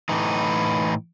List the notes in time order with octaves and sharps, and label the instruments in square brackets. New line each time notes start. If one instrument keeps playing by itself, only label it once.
[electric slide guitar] A2 E3 D#4